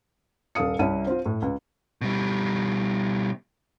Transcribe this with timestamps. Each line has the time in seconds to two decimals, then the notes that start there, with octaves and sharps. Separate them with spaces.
0.55 D#1 A4 F5 D#6 C#7
0.79 C2 C#4 E4 D#7
1.07 C4 F4
1.26 A2
1.42 C#2
2.01 B2 G3